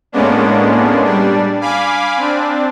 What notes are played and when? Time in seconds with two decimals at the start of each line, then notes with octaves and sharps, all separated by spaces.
0.12 A2 G#3 A#3 B3 C#4 D4
1.05 G3 D4
1.61 F5 G#5 B5 D6
2.17 C4 D4